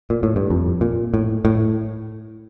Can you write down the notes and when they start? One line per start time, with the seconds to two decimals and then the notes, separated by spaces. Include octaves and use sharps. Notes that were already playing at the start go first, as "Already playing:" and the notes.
0.10 A#2
0.23 A2
0.36 G2
0.50 F2
0.81 A#2
1.14 A2
1.45 A2